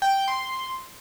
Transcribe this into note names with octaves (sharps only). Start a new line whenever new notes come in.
G5
C6